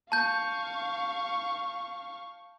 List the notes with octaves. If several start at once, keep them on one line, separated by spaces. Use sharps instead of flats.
F5 A5 C#6 G6